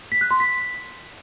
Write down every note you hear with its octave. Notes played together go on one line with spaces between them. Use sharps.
B6
F#6
C6
B6